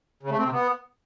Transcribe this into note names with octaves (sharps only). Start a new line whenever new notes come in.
C#3
A3
C4
C3
B3